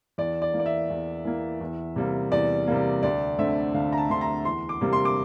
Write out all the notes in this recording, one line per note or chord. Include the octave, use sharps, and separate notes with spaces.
E2 D5
D5
E3 A#3
D5
E5
E2
E3 A#3
E2
C3 G3 A#3
E2 D5
C3 G3 A#3
D2 D5
D3 A3 C4 E5
D2 F5
A#5
A5
D3 A3 C4 C6
A#5
E2 C6
D6
C3 G3 A#3
C6
D6